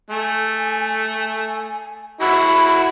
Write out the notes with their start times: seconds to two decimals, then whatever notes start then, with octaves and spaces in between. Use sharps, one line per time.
0.10 A3 G#5
2.21 E4 F#4 B5